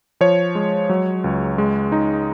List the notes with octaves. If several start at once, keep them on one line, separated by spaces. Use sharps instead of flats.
F3 C#5
G#3
F#3
C#2
G#3
D#4